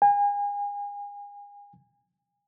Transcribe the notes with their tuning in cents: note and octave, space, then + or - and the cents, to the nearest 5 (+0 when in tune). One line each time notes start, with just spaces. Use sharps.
G#5 -35